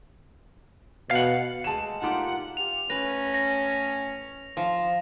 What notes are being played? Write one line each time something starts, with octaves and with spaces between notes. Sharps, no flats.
B2 F5 F#5
G#3 A3 F#4 A5 E7
A#2 A3 A#3 D#4 F4 G4 F#5
F4 G4 F7
A2 C#4 B4 A#6
A#6
F3